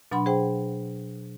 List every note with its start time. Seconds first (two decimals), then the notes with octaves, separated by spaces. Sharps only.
0.12 B2 F#3 D4 F#5 B5 C6
0.26 G#4 C5 G5